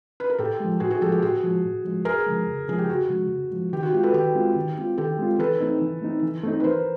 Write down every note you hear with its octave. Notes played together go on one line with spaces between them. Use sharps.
B4
A#4
A2 G4 A4
F3 G#3
A2 F#4 G#4
F#4 G#4
F3 G#3 G4 A4
G4
A2 F#4 G#4
F3 G#3
A2
F3 G#3
F2 G#4 A#4
C#3 F3 G#3
F2
C#3 F3 G#3 G#4
G4
F2 F#4
C#3 F3 G#3
F2
C#3 F3 G#3
D#3 G4
F#4
G#3 C4 F4 G4
A4 B4
D#3 G4
G#3 C4 F4
D#3
G#3 C4 F4
D#3 G4 A4
G#3 C4 F4
E3 A4 B4
A3 C4 D#4
E3
A3 C4 D#4
E3
A3 C4 D#4
B4
E3 A#4 C5